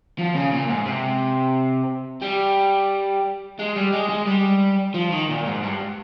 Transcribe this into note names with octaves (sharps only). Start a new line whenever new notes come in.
F3
C#3
A#2
G#2
C3
G3
G#3
G3
G#3
G#3
G3
F3
D#3
A#2
G#2
G2